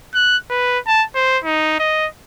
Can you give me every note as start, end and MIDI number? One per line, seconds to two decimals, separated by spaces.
0.14 0.37 90
0.50 0.79 71
0.87 1.04 81
1.15 1.38 72
1.44 1.79 63
1.79 2.07 75